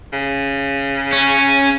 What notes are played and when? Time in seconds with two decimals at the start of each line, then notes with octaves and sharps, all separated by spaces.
0.13 C#3
1.13 C#4